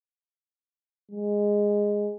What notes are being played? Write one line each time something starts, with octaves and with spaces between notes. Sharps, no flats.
G#3